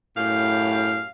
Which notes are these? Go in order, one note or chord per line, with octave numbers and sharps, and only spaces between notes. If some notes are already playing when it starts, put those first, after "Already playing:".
F#2 A2 G4 F5